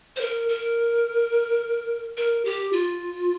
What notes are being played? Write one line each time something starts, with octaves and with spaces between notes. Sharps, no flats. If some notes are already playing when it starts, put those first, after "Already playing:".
C5
A#4
A#4
A#4
G4
F4